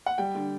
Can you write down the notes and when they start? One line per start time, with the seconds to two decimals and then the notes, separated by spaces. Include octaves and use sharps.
0.06 F#5
0.18 G3 G5
0.35 D3